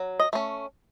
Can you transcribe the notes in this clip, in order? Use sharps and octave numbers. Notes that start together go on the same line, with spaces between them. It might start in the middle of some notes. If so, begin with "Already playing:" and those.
Already playing: F#3
D#5
A3 C#4